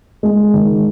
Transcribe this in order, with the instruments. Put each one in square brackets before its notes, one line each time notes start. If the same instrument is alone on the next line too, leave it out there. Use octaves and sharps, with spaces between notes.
[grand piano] G#3
D#3